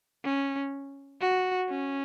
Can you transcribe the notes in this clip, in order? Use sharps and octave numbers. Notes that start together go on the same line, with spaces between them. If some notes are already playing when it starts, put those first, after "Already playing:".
C#4
F#4
C#4